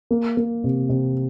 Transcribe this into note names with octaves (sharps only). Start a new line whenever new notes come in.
A#3
A#3
C3
C3